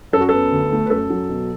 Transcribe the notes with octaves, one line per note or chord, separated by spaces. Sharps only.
F#2 A4
F#4
B3 A4
D2
A3
B4
F#2 A4
F#3
B2